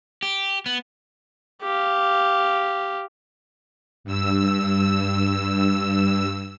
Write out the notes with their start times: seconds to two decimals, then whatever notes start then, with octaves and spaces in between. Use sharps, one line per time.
0.23 G4
0.66 B3
1.62 G4 F5
4.04 G2 E6